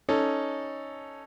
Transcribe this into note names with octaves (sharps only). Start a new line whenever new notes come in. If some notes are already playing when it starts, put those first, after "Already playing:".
C#4 D#4 A4